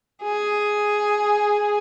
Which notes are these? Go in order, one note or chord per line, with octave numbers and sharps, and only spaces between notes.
G#4